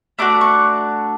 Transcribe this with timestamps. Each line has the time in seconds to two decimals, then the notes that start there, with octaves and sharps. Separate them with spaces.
0.19 A3 D4 F#4 D6
0.41 C#6